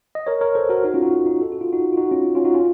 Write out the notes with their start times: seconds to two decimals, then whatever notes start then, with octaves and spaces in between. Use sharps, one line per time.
0.15 D#5
0.27 A#4 C#5
0.41 A#4 C#5
0.55 A4 C5
0.69 F#4 A#4
0.84 D#4 F#4
0.94 C#4 F4
1.02 D#4 F#4
1.26 D#4 F#4
1.42 A4
1.52 F#4
1.61 F4
1.72 D#4 F#4
1.93 F4
1.97 D#4 F#4
2.11 C#4 F4
2.35 C#4 F4
2.45 D#4 F#4
2.54 C#4 F4